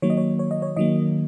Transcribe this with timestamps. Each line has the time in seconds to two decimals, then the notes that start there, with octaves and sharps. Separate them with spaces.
0.02 D#3 F#3 A#3 C#5
0.10 D#5
0.17 C#5
0.39 C#5
0.51 D#5
0.62 C#5
0.76 D#3 F#3 A#3 D#5